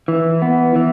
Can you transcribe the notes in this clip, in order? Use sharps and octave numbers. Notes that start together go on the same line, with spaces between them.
E3
B3
E3